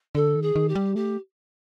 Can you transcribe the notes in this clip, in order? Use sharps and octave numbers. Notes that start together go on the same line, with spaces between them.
D3 A4
D#3
G#4
D#3
G4
G3
A3 G4